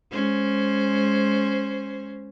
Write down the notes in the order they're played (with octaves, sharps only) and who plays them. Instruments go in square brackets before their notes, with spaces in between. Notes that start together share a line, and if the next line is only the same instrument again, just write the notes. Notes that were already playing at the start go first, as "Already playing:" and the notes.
[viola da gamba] G#3 C#4 C5